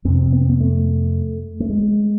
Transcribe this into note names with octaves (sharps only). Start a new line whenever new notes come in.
F2 C3 C4
B3
C4
B3
A3
A3
G#3